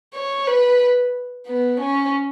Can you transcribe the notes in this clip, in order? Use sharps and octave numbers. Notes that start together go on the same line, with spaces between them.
C#5
B4
B3
C#4